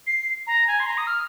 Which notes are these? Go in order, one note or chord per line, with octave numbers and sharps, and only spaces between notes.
C7
A#5
G#5
C6
A#5
D#6
F6